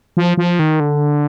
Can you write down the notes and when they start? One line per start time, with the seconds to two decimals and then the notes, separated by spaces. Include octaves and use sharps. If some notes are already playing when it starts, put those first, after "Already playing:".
0.17 F3
0.37 F3
0.59 D#3
0.80 D3